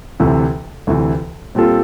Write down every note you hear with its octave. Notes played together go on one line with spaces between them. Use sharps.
D2 C3 E3
D2 C3 E3
A#2 G3 C4 F4 A4